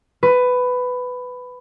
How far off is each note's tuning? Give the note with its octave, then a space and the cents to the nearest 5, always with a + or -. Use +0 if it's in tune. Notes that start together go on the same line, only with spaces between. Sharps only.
B4 +15